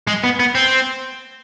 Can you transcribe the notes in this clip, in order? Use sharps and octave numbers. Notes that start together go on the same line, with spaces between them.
G#3
B3
B3
C4